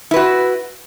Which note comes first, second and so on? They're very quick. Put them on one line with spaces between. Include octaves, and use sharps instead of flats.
E4 B4 F#4